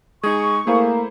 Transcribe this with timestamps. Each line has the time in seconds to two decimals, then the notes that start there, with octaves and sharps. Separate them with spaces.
0.23 G#3 D#4 G#4 C#6
0.67 A3 A#3 E4 G#4 C5